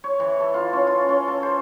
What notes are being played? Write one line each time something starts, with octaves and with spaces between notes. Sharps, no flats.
C#5
E3
A4
F4
C#4
F4
C#4
A4
C5